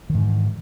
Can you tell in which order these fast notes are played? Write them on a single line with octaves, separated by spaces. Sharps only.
D#3 G#2 E3